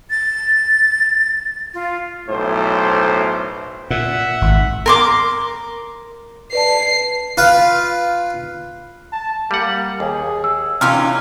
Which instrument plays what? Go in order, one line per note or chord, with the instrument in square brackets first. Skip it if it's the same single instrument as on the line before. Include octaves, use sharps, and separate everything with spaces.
[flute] A6
F4
[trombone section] B1 A2 C5
[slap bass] A#2 [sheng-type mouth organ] E5 F#5
[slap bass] G#1
[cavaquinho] A#4 C6 D6
[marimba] B4 D5 A5 [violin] C7
[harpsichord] F4 B4
[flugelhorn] A5
[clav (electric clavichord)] G3 F#5 [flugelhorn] A#3
[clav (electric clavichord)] D#2 [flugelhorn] G#4
[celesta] E6
[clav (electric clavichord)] C3 E3 [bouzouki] A#3 C#4 F4 [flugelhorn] D#4 [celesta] F6